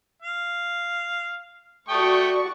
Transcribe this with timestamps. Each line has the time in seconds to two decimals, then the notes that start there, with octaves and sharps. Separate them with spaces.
0.22 F5
1.89 A3 F#4 D5 G5 C#6 D#6